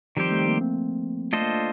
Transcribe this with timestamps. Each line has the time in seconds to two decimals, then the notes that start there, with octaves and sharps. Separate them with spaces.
0.17 D#3 F3 G3 C4 G4 C5
0.32 A3
0.46 A#3
0.61 C4
1.33 A3 D4 F4 A4 C5 D#5
1.42 A#3
1.50 A3